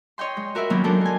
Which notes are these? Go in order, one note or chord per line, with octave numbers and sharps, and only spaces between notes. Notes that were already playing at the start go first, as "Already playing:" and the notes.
C#5 D#5 G5 C6
G#3
F#4 A#4 B4 E5
D#3 F#3 G#3 A#3 B3 C#4
F#3 G#3 D4 A4 A#4 C5
A#4 G#5